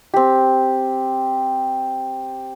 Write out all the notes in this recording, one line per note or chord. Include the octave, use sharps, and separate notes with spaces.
C4 G4